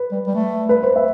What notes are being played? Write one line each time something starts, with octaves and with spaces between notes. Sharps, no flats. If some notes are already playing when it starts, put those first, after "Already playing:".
Already playing: B4
G3
G3
A3
B4
C5
E5